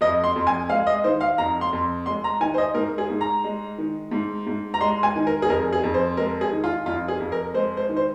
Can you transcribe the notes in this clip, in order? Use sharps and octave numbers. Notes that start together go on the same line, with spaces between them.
F2 D#5
C6
F2
G#5
G#3 F5
D#5
D#3 C5
F5
F2 A#5
C6
F2
G#3 C6
A#5
D#3 G#5
C5
D#5
G#2 A#4
G#4
G#2
A#5
G#3
D#3
G#2
G#2
A#5
G#3 C6
G#5
D#3
A#4
G#4
F2 A#4
G#4
F2
C5
G#3 A#4
G#4
D#3
F4
F2 F4
G#4
F2
A#4
G#3 C5
C5
D#3
C5